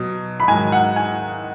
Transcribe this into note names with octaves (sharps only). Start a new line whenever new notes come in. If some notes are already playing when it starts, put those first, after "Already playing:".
Already playing: B2 F#3
B5
G#2 D#3 F#3 G#5
F#5
G#5